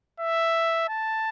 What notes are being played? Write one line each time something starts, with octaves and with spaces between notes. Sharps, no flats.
E5
A5